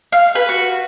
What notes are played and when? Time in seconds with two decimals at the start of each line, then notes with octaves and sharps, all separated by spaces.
0.12 F5
0.35 B4
0.49 F#4